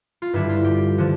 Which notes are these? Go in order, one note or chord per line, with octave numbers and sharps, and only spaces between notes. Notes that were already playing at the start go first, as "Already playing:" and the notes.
F4
G2 D3 G3 E4
F4
G4
D3 F3